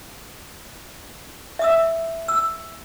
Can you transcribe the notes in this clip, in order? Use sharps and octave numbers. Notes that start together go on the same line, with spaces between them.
E5 D#6 E6
E6